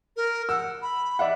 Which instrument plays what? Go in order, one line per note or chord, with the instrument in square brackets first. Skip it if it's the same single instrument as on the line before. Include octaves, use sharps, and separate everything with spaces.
[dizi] A#4
[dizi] F#5 [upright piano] E6
[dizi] B5
[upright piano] D5 E5 F#5